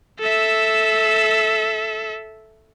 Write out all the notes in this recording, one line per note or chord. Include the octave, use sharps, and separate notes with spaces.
A4 E5